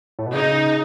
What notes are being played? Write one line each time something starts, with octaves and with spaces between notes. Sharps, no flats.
A2
B2
C#3 D#4